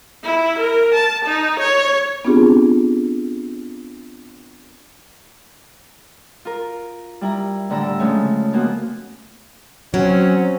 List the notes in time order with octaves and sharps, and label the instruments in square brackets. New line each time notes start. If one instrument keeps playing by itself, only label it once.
[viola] E4
A#4
A5
D#4
C#5
[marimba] B3 C4 D4 F4 G4 G#4
[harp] F4 A#4
G3 E4 A#5
A2 D3 G3 A#5 B5 E6
C#3 F3 G#3 A3 C#4
G#3 A#3 B3 F#4
[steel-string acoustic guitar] F#3 [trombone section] C4 C#4